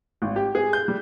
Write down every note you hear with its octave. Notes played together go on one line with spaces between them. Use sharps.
G#1
G4
G#4
G6
G3